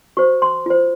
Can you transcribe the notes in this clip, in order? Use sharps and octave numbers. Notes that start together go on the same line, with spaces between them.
F#4 C5 C#6
C6
F4 C5